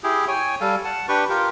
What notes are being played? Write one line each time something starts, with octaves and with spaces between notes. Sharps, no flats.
E4 G4 G#4
C#5 G5 G#5
G3 A4 F5
F#5 A5
D4 G4 B4 C#6
F4 G4 A#4